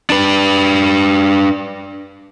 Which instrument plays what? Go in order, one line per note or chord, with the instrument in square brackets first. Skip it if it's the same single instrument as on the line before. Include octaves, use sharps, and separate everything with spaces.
[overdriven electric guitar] D4 B4